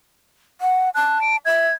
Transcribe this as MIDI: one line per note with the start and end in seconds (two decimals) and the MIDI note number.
0.61 0.89 78
0.95 1.37 81
0.95 1.21 90
1.21 1.36 98
1.45 1.68 76
1.45 1.74 92